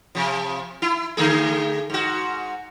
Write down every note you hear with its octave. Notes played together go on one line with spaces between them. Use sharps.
C3 F3
E4
D3 A3 G#4
G#2 F#4